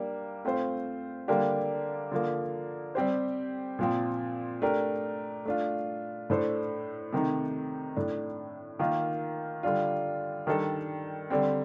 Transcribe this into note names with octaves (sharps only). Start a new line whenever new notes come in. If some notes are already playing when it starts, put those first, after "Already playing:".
Already playing: G3 A#3 D4
A3 C4 F4 C5
D3 G3 A#3 D4 G4
D3 F3 A#3
G3 C4 G4 C5
A#2 F3 C4
A3 D4 G4 A#4
A3 D4 F4
A2 A3 D4 A4 C5
C3 D#3 A3 D#4
A2 A3 D4
D#3 A#3 F4
D3 G3 D4 F4
D#3 G3 D4 A4
D3 G3 C4